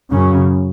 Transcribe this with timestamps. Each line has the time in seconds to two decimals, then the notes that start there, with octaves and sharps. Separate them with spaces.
0.12 F#2 C#3 C#4